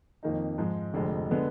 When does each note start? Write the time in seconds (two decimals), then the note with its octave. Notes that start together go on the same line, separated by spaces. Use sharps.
0.23 F2 D#3 A#3 D#4
0.58 G#2 F3 G#3
0.93 F1 F2 D3 G#3
1.31 D3 G#3 B3